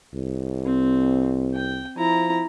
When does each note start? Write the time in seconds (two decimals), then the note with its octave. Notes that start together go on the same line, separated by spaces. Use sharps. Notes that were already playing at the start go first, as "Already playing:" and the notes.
0.15 C2
0.65 C4
1.54 G5
1.97 F3 E4 A#5